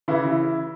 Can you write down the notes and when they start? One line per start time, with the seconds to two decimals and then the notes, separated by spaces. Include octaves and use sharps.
0.08 C#3 E3 E4
0.27 E4